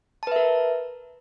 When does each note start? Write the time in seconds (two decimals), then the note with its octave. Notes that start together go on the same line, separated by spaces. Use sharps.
0.23 A5
0.27 B4
0.32 E5
0.36 A#4